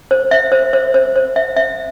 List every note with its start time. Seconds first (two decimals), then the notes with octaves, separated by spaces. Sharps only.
0.11 C5
0.31 E5
0.52 C5
0.73 C5
0.94 C5
1.16 C5
1.36 E5
1.57 E5